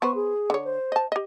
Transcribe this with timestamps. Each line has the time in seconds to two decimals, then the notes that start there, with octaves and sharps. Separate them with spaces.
0.02 B3 B4 C5 C#6
0.15 G#4
0.50 D3 C#5
0.65 C5
0.92 D#5 A5
1.12 G4 D#5